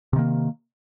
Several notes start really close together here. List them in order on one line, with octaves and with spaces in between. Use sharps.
C3 D#3 A#3